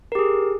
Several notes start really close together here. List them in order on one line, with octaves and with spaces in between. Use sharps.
A#4 G4 G#4